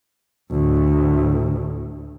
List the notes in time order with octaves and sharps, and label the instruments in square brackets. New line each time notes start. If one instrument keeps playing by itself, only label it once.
[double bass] D2 A2